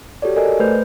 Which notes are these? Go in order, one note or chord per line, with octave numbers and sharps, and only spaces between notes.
F#4 G4 A4 C#5 D5
A4 A#4 D5 D#5 G#5
A3 B4 C5 G6